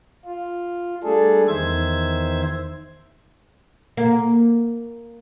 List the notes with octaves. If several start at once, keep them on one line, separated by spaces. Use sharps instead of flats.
F4
G3 A3 D4 G#4 A4
E2 D#3 C5 E5 G#6
A#3